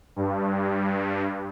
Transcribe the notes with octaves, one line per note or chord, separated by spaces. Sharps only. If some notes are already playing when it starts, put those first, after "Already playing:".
G2